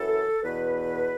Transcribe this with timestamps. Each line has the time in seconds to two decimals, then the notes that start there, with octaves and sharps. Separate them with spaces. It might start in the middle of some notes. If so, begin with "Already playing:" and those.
Already playing: F#2 E3 A4
0.43 E2 B2 B4